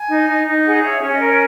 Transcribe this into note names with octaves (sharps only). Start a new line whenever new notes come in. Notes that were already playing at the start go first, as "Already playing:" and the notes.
Already playing: G#5
D#4
D#4
D#4
G#4 F#5
C#5 E5
C#4 C#5
D#5
A#4
C#5